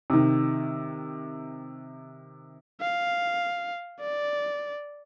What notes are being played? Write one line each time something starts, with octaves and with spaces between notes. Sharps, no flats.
C3 D#3
F5
D5